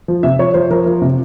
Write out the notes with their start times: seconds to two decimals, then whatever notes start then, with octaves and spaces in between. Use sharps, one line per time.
0.08 F3
0.23 C3 E5
0.39 F3 C#5
0.54 F3 C5
0.70 F3 A#4
0.86 F3
1.02 C3